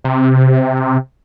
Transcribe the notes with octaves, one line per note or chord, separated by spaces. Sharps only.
C3